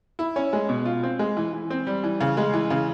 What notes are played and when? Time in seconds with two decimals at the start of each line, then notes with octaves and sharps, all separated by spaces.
0.19 E4
0.36 C#4
0.53 G#3
0.69 B2
0.85 F4
1.03 C4
1.19 G#3
1.37 E3
1.53 E3
1.70 C4
1.87 G3
2.04 E3
2.20 C#3
2.37 G#3
2.54 E3
2.70 C#3